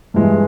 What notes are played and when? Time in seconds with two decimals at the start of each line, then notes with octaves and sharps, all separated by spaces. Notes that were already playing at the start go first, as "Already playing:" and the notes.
0.14 G2 E3 G#3